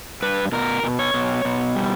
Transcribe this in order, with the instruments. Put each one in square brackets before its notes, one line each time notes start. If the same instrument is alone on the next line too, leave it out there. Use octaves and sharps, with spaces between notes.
[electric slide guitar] G2 B4
B2 A#4
B2
C#5
B2
B2
G3